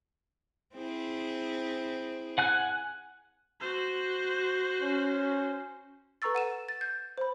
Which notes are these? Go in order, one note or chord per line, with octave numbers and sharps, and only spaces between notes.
C4 E4 G#4
F#5 G#5 F#6
F#4 C5
C#4
A4 B4 A#5 C#6 E6 A6
F#5 D#7 E7
A6
G6
C5 B5